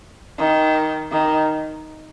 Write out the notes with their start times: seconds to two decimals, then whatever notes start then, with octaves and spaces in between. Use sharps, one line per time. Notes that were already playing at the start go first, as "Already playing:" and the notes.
0.39 D#3
1.12 D#3